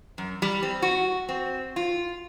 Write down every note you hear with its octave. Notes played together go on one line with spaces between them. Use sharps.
F#2
G3
C4
F#4
C4
F4